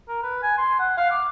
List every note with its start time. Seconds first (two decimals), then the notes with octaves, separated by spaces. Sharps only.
0.08 A#4
0.23 B4
0.42 G#5
0.58 C6
0.79 F#5
0.97 F5
1.10 D6